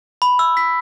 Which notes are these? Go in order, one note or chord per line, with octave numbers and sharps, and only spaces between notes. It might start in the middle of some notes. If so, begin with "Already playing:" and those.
B5
E6
B6